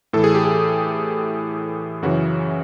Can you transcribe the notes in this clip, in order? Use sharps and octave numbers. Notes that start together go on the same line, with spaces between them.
A2 E3 A4
G#4
G4
G#4
F#2 C#3 E3 F#4